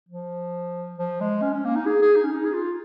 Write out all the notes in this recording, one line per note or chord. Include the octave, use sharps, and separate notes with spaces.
F3
F3
G#3
C#4
C#4
A#3
D#4
G#4
G#4
D#4
C#4
D#4
G#4
F4